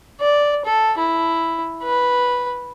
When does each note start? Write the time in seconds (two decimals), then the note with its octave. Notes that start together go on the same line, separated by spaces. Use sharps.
0.20 D5
0.65 A4
0.98 E4
1.83 B4